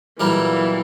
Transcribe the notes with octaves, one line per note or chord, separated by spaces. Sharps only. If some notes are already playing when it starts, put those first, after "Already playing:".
B1 A#2 E3 G3 A#3